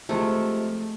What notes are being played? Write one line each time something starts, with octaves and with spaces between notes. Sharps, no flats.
C3 F3 G#3 A3